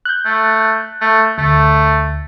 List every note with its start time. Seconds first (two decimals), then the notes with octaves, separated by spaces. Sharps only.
0.05 F#6 G6
0.25 A3
1.01 A3
1.38 D2 A3